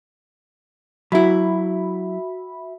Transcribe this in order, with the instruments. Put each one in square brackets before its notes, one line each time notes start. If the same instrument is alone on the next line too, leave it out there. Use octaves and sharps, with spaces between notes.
[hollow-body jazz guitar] F#3 E4 [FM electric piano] F#4 E5 B5